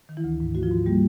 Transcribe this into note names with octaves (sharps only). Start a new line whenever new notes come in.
D#3
E3 E4
D2
G#2
A3 F#4
F3 F4
G#2
G3 A#3 G4